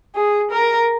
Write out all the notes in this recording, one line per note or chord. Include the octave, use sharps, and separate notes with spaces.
G#4
A#4